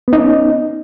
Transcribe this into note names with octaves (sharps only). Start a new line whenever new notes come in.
B3 C#4 D#4